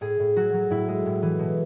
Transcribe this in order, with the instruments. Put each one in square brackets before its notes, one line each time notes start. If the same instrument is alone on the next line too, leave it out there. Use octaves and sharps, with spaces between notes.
[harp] A2 G#4
A2
F#3 F#4
F#3
A2 E4
G#3
A2
E3
B2